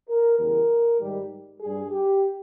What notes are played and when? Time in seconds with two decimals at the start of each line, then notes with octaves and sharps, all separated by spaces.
0.09 A#4
0.39 E2 C#3 G3 A#4
1.00 G#2 D#3 G3
1.61 G2 G3 G#4
1.91 G4